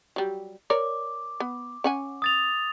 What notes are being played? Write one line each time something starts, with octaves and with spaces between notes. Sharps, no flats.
F#3 G3
A#4 C#5 D5 D6
B3
C#4 F#5 G#5
D#6 A6 F7